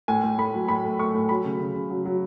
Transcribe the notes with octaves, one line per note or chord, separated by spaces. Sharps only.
A2 G#5
A2
A2 B5
F#3
A2 B5
A3
A3 C#6
A2
F#3 B5
C#3
C#3
C#3
F#3
F#3